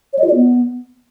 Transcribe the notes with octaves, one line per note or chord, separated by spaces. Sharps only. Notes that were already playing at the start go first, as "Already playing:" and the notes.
C#5
D#5
F4
D5
B3